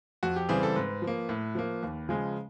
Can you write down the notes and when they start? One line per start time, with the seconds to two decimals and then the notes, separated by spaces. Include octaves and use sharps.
0.23 F2 F#4
0.36 G4
0.49 C#3 E3 G3 C4 G#4
0.63 A4
0.76 G#2 B4
1.02 F3
1.07 A#3
1.29 A2
1.55 F3 A#3
1.83 D#2
2.09 C#3 F3 G#3